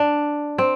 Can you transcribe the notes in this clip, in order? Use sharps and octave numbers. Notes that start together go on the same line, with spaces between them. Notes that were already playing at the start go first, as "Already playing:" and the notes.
Already playing: D4
C4